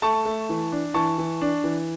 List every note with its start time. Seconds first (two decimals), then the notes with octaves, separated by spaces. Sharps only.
0.02 A3 A5 C#6
0.25 A3
0.49 E3
0.72 D4
0.94 E3 A5 C#6
1.18 E3
1.41 D4
1.64 E3